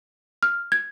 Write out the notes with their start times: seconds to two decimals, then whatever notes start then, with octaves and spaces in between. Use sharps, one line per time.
0.43 F6
0.72 G#6